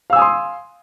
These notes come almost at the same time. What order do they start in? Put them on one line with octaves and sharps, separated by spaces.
F5 E6 G#5 D#6 C6